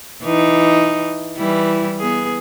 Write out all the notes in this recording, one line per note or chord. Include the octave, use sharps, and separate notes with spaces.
E3 D#4
E3 G3 E4
B3 G#4